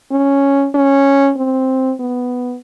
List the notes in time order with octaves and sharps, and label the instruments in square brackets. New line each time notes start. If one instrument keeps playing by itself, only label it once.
[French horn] C#4
C#4
C4
B3